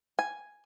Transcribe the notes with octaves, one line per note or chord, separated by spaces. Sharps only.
G#5